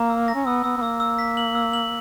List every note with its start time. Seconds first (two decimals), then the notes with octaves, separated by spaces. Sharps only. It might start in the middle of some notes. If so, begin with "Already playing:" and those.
Already playing: A#3 A#5
0.10 E6
0.28 A#6
0.35 C#4
0.47 B3 E6
0.64 B3 E6
0.77 B3
0.82 A#3 E6
1.00 E6
1.19 B6
1.37 F#7
1.55 E6
1.73 F#7